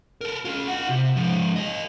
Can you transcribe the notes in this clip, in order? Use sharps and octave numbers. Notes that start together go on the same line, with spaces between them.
A4 A#4
C#4 F4
F4 F#5
C3
G#2 F3
G4 D#5